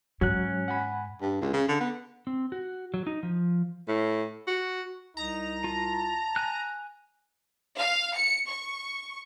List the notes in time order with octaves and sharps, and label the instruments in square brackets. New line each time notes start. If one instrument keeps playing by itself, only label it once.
[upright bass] G#2 [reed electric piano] F#3 [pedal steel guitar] C#4 F#6
[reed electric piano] F#5 G#5 B5
[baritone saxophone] G2
C#2
C#3
D3
B3
[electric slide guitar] C4
F#4
F#3
D#4
F3
[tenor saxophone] A2
F#4
[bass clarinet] C2 [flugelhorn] D#4 [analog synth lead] A#5
[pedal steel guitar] F4 [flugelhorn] A5
[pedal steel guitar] G#5 F#6
[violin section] F5
C#7
C#6